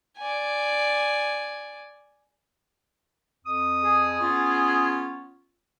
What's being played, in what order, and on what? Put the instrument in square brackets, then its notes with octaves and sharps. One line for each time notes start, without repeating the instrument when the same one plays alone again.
[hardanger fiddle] D5 G#5
[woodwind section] F2 D#6
[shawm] G#4
[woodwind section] B3 C#4 F4